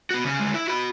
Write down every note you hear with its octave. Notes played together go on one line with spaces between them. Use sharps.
B3 F#4
C#3 C#4
D2 G#3
E4
F#4 B5